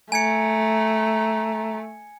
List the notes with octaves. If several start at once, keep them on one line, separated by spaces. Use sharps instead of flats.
A3 G#5 A#5 G#6 C#7